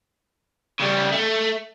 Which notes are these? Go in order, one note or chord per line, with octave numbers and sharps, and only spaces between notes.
C#3 G3
A3